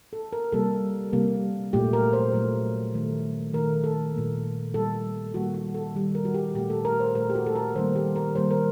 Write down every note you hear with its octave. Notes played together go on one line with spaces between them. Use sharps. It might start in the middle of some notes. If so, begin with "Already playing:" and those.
A4
A#4
C3 G3 A#3 A4
C3 G3 A#3
A#2 F#3 A3 G4
A#4
C5
A#2 F#3 A3
D#3 A3
D#3 A3 A#4
A4
A#2 G3 A#3
A#2 G3 A#3 A4
D#3 G3 A#3 F#4
F#4
A4
D#3 G3 A#3
A#4
F#4
G4
A#2 A3 G4
A4
A#4
C5
A#2 A3 A#4
G4
F#4
A4
A#4
D#3 G3 A#3 C5
G4
A#4
D#3 G3 A#3 C5
A#4